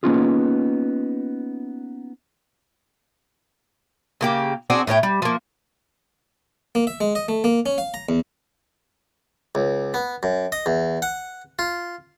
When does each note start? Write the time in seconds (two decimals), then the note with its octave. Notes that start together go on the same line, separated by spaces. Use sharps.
0.03 A#3 B3 C#4 D#4 F4 G#4
4.21 C#3 A#3 G4
4.70 C4 D4 F#4 G#4
4.87 A2 A3 C#5 G5
5.03 G3
5.22 F3 A#3
6.75 A#3
6.87 E5
7.01 G#3
7.15 D#5
7.28 A3
7.44 A#3
7.66 C#4
7.78 F5
7.94 A#5
8.09 E2
9.55 C#2
9.94 B3
10.23 F#2
10.52 D#5
10.66 E2
11.02 F#5
11.59 F4